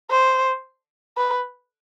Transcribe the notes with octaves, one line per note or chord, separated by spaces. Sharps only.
C5
B4